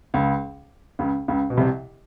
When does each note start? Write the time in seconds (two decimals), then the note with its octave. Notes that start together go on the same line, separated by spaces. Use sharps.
0.14 C#2 C#3
0.99 C#2 C#3
1.28 C#2 C#3
1.50 B2
1.57 C2 C3